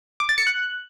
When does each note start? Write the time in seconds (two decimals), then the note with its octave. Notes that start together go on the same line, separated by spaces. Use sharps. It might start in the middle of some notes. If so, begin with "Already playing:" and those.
0.20 D6
0.29 A6
0.38 C#7
0.47 F#6